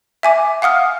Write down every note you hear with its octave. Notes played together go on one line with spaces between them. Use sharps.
E5 G#5 D6
F5 F#5 D#6 F6